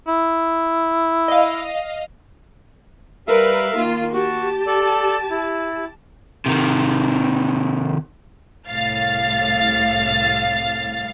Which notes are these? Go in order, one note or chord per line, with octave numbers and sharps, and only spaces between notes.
E4
D#5 F5
G3 A#4 B4 E5 F5
D#3 A#3 F4
F#4 G4 A5
A4 D5
E4
C3 D#3
C2 A2 F5 A6